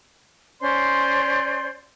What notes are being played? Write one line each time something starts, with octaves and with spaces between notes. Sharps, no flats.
C#4 C5 D5 C6